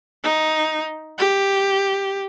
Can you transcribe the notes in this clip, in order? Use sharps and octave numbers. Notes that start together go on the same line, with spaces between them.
D#4
G4